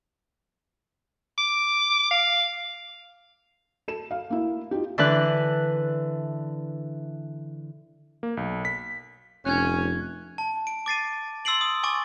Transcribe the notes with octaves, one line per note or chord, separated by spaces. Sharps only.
D6
F5
A4 E7
F5
A#3 E4
D#4 F4 G4
D3 E3 D4 B4 F#6
A#3
B1
B6
F1 C#4 F#6 G#6
A5
D7
D6 A6 C7 D#7
C6 E6 A6 C7 D7 F#7
D#6
G#5 C#6 D6 A6